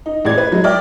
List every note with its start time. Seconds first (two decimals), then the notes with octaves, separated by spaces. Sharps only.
0.06 D#4
0.25 A1 G#4 D5 G#6
0.38 B4
0.52 F#3 G#3
0.64 D5 E5 G5 D6 F6